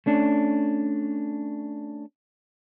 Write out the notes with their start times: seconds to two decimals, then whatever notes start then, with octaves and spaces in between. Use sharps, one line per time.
0.06 A3 C#4 D4